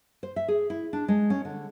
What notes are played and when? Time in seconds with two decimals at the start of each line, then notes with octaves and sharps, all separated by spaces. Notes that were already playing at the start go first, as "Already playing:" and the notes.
0.23 C5
0.36 E5
0.48 G#4
0.70 E4
0.93 D4
1.08 G#3
1.30 C#4
1.45 D3